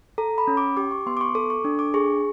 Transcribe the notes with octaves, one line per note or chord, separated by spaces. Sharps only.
A4 A#5
B5
C#4
D6
G4 D6
C#6
B3 C6
D6
C#6
A4 D6
C#6
D4
D6
G#4 C#6